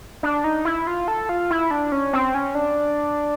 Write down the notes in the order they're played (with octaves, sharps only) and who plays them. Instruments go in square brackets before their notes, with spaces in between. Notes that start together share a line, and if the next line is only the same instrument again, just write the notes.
[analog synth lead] D4
D#4
E4
F4
A4
F4
E4
D4
C#4
C4
C#4
D4